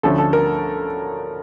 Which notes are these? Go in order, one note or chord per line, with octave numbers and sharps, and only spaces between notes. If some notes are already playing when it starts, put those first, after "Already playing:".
D2 D3 F3 A3 C#4 A4
A4
A#4